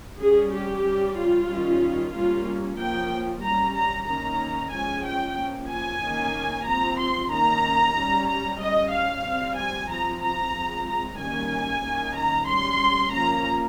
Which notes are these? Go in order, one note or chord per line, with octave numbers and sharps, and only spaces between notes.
G3 C#4 G#4
G4
G3 C#4
F4
D#3 G3 C#4
G3 A#3 C#4 F4
F3 A#3 C#4 G5
G3 C#4 A#5
A#5
D#3 A#3 C#4 A#5
F3 G#3 C#4 G#5
G5
F3 A#3 C#4
G#5
D#3 A#3 C#4
F3 C4 A#5
C6
D#3 A#3 C#4 A#5
G3 C#4
A#5
G3 C#4 D#5
F5
G3
C4
G#5
F3 C4 A#5
A#5
F3 G#3 C4
A#5
D#3 G3 A#3 C#4 G#5
D#3 A#3 C#4
A#5
G3 C#4 C6
F3 A#3 C#4 A#5